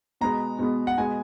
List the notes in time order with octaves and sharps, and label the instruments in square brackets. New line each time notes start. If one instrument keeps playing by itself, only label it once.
[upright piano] B2 G#3 B3 [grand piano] A#5
[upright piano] B2 G#3 B3
[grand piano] F#5
[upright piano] B2 G#3 B3 [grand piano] G#5